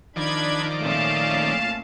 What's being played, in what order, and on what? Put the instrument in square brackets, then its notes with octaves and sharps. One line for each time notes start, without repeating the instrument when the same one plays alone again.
[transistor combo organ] D#3 F3 D5 [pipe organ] D4 B5 G#6
[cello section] A#2 A3 C#4 [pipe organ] F5 A5